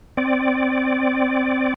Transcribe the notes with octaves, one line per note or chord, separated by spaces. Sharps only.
C4 D5